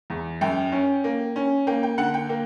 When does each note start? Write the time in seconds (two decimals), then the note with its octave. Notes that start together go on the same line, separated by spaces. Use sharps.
0.10 E2
0.41 F#2 G5
0.72 C#4
1.04 A#3
1.36 C#4
1.67 A#3 G5
1.83 G5
1.98 D3 F#5
2.14 G5
2.29 A#3